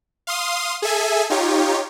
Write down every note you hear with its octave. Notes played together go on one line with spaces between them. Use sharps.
F5 C6 D#6
G#4 A4 E5 G#5
D#4 F4 G4 C#5